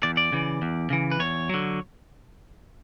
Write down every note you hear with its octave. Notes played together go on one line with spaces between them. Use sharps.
E2 D5
D5
C#3 E3
E2
C#3 E3
B4
E2 C#5
D3 F#3